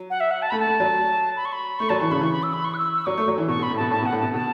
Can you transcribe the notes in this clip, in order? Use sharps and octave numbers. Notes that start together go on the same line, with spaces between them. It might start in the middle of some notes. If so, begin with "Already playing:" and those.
Already playing: F#3
F#5
E5
F#5
A5
A3 B5
A5
A3
F#3
B5
C#6
B5
A3 C#6
F#3 A5
E3 C#6
C#3 B5
E3 C#6
B5
E6
B5
C#6
F#6
E6
E6
F#3 C#6
A3
F#3
E3
B2 C#6
B2 B5
A2
B2 A5
A2 A5
B2 F#5
A2
B2 A5
B2 A5